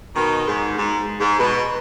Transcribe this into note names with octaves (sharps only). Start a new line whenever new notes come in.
B2 D#3
G#2
G#2
G#2
B2